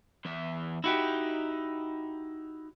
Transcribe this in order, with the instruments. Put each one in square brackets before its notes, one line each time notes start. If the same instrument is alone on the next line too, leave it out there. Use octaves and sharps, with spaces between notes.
[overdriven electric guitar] E2 E5
[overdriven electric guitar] D#4 [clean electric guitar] E4 F#4 G4